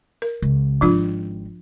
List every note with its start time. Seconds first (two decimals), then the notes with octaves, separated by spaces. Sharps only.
0.22 A#4
0.42 C#2
0.81 G#1 F3 D4 F4